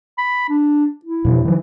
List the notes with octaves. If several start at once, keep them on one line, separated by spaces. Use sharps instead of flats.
B5
D4
E4
F2 B2 F3
D#3 F3